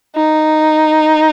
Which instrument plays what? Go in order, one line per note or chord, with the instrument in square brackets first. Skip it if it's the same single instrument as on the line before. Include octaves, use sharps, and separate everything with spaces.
[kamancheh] D#4